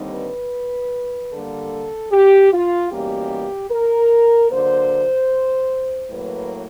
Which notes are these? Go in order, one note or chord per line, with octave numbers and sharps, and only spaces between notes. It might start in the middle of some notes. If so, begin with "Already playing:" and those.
Already playing: D#2 D3 G3 C4 D#4
B4
D3 G3 A#3 A4
G4
F4
E2 B2 G3 A#3 C#4 G4
A#4
D3 F#3 A#3 C5
A2 F#3 A#3 B4